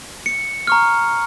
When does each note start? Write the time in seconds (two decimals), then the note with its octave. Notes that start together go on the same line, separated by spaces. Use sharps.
0.26 C#7
0.67 A#5 C#6 F6